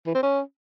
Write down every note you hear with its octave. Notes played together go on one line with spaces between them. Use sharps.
E3
C4
C#4